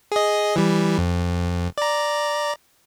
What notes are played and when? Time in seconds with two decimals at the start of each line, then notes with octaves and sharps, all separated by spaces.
0.12 G#4 D#5
0.56 E3 G3
0.98 F2
1.78 D5 A#5